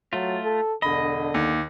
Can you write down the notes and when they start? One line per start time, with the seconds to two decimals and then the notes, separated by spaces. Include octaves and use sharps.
0.13 F#3 A3 F4
0.45 A4
0.82 E1 D3 D#5 B5
1.34 D#2